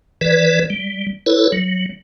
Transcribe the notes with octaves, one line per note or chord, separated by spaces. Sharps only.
E3 B4 D5
G3
E4 A4 B4 C#5
F#3